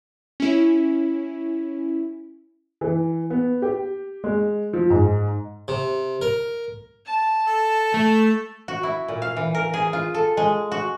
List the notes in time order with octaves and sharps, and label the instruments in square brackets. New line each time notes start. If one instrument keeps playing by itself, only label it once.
[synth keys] C#4 E4
[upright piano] E3
B3
G4
G#3
F3
G#2
[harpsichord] C3
A#4
[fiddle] A5
[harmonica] A4
[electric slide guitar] A3
[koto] F#4
E4
A#2
F5
E3
A#4
G#4
F4
A4
G#3
F#4